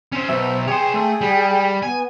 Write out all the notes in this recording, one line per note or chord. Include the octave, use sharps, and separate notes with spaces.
C#4 C5
B2 F#3 C5 E5
G#4 C#5 G5 C6
A3
G3
B3 G#5